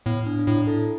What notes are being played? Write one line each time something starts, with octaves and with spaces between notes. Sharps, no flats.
A2 B3
D4
D4
A2 E4
E4 A4